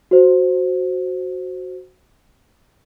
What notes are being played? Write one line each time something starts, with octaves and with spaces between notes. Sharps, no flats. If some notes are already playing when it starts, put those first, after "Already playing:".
F#4 C5